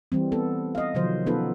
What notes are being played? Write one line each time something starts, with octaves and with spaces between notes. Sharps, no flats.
E3 G3 C4
B3 A4
D#5 F5
C3 D#3 F3 F#3 C5
B3 C#4 D#4 F4 A4 B4